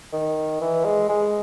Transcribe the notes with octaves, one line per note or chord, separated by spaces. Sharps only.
D#3
E3
G#3
G#3